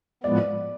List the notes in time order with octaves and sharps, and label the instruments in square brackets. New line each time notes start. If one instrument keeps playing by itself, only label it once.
[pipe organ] A2 F3 G#3 B3 [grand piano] D5